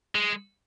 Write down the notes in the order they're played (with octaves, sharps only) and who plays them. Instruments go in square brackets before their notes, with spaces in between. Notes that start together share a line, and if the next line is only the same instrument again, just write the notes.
[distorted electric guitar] G#3